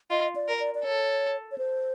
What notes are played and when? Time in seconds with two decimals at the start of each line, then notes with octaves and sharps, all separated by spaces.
0.10 F4 D#5
0.36 D5
0.48 A#4
0.60 D5
0.75 D5
0.84 A4 C#5
1.51 C#5
1.58 C5